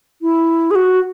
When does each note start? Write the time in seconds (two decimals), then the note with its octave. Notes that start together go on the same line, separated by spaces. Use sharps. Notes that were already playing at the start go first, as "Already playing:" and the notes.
0.22 E4
0.71 G#4
0.75 F#4